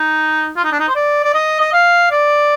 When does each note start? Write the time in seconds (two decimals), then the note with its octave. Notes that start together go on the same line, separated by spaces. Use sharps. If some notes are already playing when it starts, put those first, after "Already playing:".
Already playing: D#4
0.56 F4
0.64 D#4
0.72 D4
0.80 D#4
0.88 C5
0.95 D5
1.24 D5
1.34 D#5
1.60 D#5
1.73 F5
2.11 D5